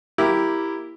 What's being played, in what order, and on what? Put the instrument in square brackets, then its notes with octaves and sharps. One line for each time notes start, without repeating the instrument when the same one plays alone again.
[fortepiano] A#3 E4 G4